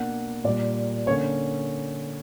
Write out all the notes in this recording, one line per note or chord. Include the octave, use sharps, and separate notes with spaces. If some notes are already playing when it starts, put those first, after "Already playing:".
Already playing: B2 A#3 D4 F#5
A#2 G3 A#3 D5
D3 A#3 C#4 C#5